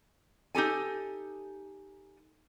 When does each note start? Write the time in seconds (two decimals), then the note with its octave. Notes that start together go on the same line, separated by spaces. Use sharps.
0.55 D#4 G4 A4 G#5